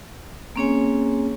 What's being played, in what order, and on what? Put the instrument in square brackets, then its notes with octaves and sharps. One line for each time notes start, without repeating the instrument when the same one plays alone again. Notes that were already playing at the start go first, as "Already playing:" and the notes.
[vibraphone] A#3 C4 C#4 G#4 C#5 G#5